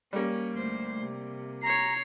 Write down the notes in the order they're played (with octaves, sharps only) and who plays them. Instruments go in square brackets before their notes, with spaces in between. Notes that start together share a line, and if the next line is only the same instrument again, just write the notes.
[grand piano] G3 A#3 [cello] C#4
[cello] D2 C5
C3
[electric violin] C#5 C7 [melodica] A#5